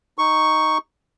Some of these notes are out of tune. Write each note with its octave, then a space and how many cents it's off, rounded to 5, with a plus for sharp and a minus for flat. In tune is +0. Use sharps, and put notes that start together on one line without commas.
D#4 +0 C#6 +0